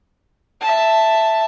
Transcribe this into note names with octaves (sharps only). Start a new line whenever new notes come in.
E5 A5